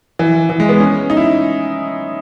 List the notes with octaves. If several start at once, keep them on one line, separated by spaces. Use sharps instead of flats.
E3
E3
G#3
B3
C#4
D#4
E4